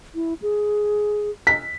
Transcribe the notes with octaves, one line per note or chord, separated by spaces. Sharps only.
E4
G#4
B6